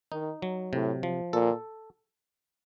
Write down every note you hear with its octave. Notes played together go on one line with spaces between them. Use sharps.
D#3 D#4
F#3
A2 C3
F3
A#2 A4